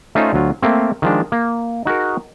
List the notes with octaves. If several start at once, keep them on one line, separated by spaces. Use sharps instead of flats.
A3 C#4 D#4 F4 C5
D2 F#3 F4
A3 A#3 C4
D#3 F3 G#3 D4
A#3
D#4 F#4 G#4 A#4